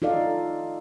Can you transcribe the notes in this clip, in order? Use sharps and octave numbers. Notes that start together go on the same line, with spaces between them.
D#4 F4 A4 D5 F5